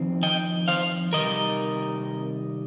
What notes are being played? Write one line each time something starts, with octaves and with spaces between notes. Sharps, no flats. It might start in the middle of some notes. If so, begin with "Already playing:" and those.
Already playing: F2 D#3 C4
D#5 G5
C5 F5
C3 D#3 G3 A#4 D#5